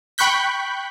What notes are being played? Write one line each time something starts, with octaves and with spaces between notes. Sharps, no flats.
G5 B5 C#6 F#6 G6 B6